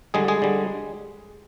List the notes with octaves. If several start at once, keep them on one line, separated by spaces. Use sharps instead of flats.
D3 G3 G#3 G#4
G#3 G#4
D3 G3